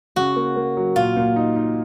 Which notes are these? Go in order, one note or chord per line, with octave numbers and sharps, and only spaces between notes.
C#3 F#4
A#3
A#3
F#3
A#2 F4
A#2
D#4
D#4